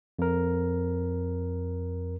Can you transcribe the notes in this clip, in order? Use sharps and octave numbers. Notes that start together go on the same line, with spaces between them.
F2 A#4